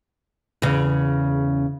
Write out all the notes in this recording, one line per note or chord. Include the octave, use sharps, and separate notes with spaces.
E2 C#3